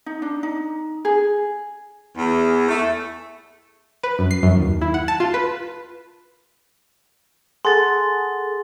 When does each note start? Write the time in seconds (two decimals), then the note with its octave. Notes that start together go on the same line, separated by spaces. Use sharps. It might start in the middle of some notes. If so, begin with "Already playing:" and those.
0.06 D#4
0.22 D4
0.43 D#4
1.05 G#4
2.17 E2
2.69 A3
4.03 B4
4.19 F#2
4.31 C7
4.43 F#2
4.57 D#2
4.81 E4
4.94 F#5
5.08 A5
5.20 F4
5.34 B4
7.65 G#4 A4 F#5 C6 A6